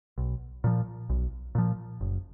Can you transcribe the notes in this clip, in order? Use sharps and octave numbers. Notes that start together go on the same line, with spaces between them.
B1
A#2 F3
B1
A#2 F3
F#1